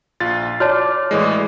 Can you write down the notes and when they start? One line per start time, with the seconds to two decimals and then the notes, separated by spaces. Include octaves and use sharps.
0.20 A#1 F4 A6
0.60 F#4 C#5 D5 A5 F6
1.11 A2 E3 G#3